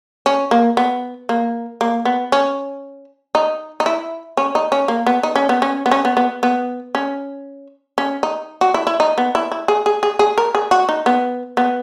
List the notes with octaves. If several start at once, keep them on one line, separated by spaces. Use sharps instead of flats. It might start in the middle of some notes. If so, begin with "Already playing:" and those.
C#4
A#3
B3
A#3
A#3
B3
C#4
D#4
D#4
E4
C#4
D#4
C#4
A#3
B3
D#4
C#4
B3
C#4
B3
C#4
B3
B3
B3
C#4
C#4
D#4
F#4
E4
E4
D#4
B3
E4
E4
G#4
G#4
G#4
G#4
A#4
G#4
F#4
D#4
B3
B3